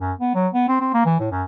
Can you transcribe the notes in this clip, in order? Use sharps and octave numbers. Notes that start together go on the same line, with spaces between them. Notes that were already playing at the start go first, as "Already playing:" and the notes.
F#2
B3
F#3
B3
C4
C4
A#3
E3
A2
F#2